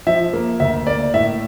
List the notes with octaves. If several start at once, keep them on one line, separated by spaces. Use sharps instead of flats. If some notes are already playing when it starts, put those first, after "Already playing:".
F3 E5
A#3
D2 E5
A#3 D5
A2 E5